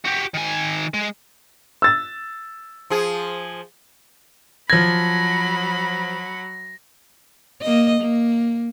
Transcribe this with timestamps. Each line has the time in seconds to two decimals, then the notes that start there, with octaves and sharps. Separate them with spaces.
0.05 F#4 G4
0.34 D#3 G#5
0.94 G#3
1.82 E6 A6
2.90 F3 G#4
4.70 F3 F#3 B5 G#6 A#6
7.61 A#3 D#5
8.00 A#3